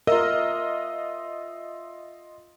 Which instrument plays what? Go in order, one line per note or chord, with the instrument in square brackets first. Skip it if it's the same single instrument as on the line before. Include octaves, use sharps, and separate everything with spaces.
[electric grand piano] F4 D#5 [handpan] A#4 [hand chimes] E5 E6